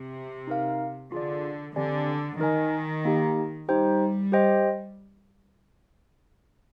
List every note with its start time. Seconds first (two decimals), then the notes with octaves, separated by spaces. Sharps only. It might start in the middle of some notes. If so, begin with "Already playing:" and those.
Already playing: C3
0.47 D#4 A#4 F5
1.12 D3 F4 G#4 D5
1.76 D3 C4 G4 D5 G#5
2.40 D#3 D#4 A#4 D#5 G#5
3.05 A#3 D#4 G4
3.69 G3 D#4 G4 C5 G5
4.32 G4 C5 D#5 G5